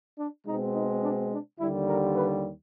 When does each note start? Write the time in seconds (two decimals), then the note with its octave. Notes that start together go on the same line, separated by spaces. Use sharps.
0.19 D4
0.46 B2 G#3 C4 D#4
0.75 D#4
1.02 D4
1.32 D4
1.59 D#2 D3 G3 E4
1.88 A#4
2.16 B4